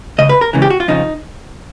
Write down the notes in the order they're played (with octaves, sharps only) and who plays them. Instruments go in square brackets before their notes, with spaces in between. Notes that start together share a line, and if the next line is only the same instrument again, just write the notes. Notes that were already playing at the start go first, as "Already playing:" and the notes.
[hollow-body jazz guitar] C#2 C#3 D#5
B4
A#4
C#2 C#3 E3
G4
F#4
F4
F2 C#3 F3 D#4